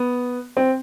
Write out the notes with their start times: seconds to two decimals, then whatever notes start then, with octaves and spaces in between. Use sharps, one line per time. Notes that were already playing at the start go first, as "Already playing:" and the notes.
Already playing: B3
0.57 C4